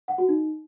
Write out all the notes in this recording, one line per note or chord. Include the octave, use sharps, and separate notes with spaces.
F#5
F#4
D#4